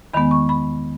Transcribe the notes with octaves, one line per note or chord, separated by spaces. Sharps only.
E2 D#3 G#3 B3 B5
C#6
B5